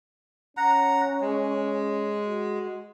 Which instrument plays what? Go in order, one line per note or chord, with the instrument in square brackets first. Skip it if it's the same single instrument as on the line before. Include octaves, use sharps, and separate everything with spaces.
[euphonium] C#4 [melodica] F#5 A#5
[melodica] G#3
[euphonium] F#4